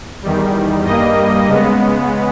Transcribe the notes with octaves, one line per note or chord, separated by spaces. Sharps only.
E2 D#3 G3
G2 G3 A#3 D#5
C#3 G#3 B3